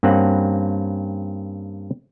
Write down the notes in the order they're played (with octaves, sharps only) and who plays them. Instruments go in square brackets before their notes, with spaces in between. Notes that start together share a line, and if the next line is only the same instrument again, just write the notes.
[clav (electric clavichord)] G2 A#3 C4 C#4 F#5